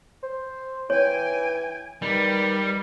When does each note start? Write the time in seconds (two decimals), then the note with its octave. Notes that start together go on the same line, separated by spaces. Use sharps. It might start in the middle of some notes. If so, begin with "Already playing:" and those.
0.23 C5
0.90 E3 C#5 G5 G#5
2.02 D#3 G3 B4 D5